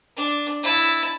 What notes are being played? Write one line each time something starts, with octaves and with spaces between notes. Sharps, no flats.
D4
E4 A5